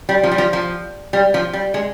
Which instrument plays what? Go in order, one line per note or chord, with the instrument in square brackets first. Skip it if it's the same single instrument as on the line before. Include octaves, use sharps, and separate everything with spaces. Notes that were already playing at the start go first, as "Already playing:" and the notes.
[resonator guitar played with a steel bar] G3
F3
G3
F3
F3
G3
F3
G3
G#3